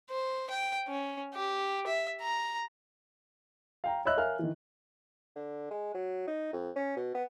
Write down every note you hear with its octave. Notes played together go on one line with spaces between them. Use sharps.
C5
G5
C#4
G4
E5
A#5
F5 G5 A#5
C#5 D#5 E5 B5 E6 F#6
A#4 C#5 E5 F5 G#5 F6
D#3 E3
D3
G#3
F#3
D#4
F2
C#4
B2
B3